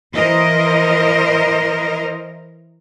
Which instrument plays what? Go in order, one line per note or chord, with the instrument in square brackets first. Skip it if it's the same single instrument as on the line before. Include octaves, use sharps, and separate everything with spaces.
[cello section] E3 A#4 C5 D#5